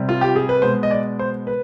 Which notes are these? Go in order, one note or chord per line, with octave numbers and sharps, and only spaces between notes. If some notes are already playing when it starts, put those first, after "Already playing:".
Already playing: C3 G3
F4
G4
G#4
B4
B2 G#3 C5
D#5
D5
C5
B4